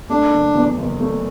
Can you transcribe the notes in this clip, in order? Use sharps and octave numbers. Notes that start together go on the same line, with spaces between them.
A3 D4
F#1
E2
F#1
A3